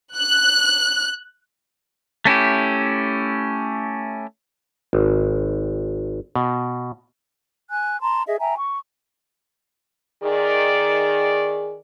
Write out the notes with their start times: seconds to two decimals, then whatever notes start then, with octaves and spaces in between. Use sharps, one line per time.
0.16 F#6
2.25 A3 C#4 E4 G4
4.93 G#1
6.36 B2
7.70 G#5 F#6
8.01 A5 A#5 C6
8.26 G#4 D#5 E5
8.40 E5 G5 G#5 A#5
8.58 C#6
10.23 D#3 G#4 D5